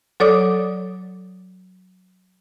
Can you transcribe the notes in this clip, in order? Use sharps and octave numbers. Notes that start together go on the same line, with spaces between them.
F#3 A4 C#5 D5 D6 D#6